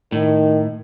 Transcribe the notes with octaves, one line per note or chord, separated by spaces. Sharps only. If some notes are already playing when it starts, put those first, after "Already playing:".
A2 D#3